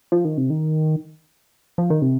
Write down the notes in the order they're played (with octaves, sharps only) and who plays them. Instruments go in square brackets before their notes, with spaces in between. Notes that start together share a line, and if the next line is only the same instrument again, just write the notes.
[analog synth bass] F3
D#3
C3
D#3
F3
D#3
C3